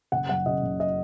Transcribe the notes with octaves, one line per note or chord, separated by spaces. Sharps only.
F#1 F#5
F#2 F#5
C#3 D#5
F#1
D#5